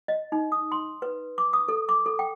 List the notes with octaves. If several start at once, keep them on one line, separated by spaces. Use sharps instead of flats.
D#5
D#4
D#6
C6
B4
D6
D#6
A4
D6
A4
G5